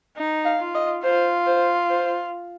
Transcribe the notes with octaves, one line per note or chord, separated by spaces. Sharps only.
D#4
F5
F4
D#5
F4 C5
C5
C5